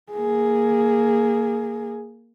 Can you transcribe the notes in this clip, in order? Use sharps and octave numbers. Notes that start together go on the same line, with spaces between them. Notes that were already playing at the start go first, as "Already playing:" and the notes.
A#3 G#4